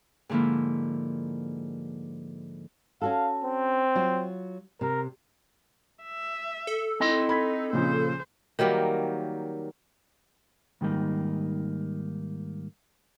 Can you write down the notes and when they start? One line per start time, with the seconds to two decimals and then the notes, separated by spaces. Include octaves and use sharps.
0.29 G#2 D3 F3 A#3 E4
3.02 C#4 F#4 A4 F5
3.44 C4
3.95 F#3 F4 F#4
4.81 C3 A#4
6.04 E5
6.67 A4
7.00 C4 D#4 E4 D#5 C6
7.29 D#4 B5 G#6 B6
7.73 A#2 C#3 F3 C5
8.59 D#3 F#3 G3 A#3
10.81 G#2 D#3 G3 A#3 D#4